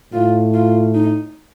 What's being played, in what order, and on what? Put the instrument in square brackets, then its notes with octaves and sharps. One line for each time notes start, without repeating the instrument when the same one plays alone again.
[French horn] A2 [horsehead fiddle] F4
[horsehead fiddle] F4
D#4